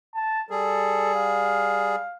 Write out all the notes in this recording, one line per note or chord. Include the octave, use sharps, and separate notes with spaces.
A5
G3 G#4 A4
F5